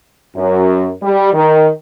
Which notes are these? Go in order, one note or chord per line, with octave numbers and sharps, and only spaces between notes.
F#2
G3
D#3